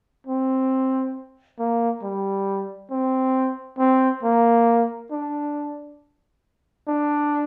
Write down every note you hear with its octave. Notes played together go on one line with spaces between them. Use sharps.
C4
A#3
G3
C4
C4
A#3
D4
D4